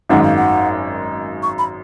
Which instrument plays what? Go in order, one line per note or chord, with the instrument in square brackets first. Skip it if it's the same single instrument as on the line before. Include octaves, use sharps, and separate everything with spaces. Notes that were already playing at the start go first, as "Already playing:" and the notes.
[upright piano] G#1 F#2 D#3 G#3 [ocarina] F#5
[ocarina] F5
F#5
C#6
B5